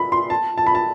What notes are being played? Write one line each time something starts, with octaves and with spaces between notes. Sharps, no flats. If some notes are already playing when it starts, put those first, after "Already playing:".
Already playing: B5
C6
A5
A5
B5
A5